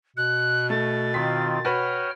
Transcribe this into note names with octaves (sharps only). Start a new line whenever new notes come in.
B2 F#6
A3 A6
D#3 C4 F4 B6
F#4 B4 C#5 G5 B5 F6